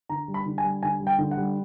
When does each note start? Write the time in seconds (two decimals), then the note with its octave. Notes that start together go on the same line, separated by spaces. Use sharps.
0.09 D3 A#5
0.28 G3
0.34 B5
0.46 D3
0.58 G#5
0.64 G3
0.83 D3 G#5
1.00 G3
1.07 G5
1.19 D3
1.31 F#5
1.37 G3